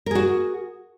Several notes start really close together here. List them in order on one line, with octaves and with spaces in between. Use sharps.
A#4 G#4 F#4